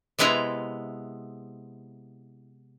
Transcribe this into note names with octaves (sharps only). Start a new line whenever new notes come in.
C3 G#3 B3 E4 A#5